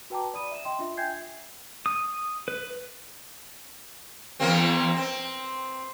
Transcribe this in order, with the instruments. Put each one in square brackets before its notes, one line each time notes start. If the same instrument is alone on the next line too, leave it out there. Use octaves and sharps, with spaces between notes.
[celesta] F#4 B4 G5 A5 A#5 D6
D5 B5 D#6 D#7
E5 E7
D#5 G5 C6
D4 F4 E5
E5 G5 G#5 G6 G#6 C7
[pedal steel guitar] D#6
B4
[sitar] E2 A#3 C4
C4